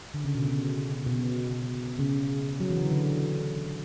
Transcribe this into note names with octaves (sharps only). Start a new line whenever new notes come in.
D3
C#3
B2
C#3
B2
C#3
F#3
E3
D3
D3